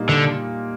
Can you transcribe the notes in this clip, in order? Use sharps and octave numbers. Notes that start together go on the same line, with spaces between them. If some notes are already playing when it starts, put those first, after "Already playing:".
Already playing: A#2 G3 A#3 D#4
D3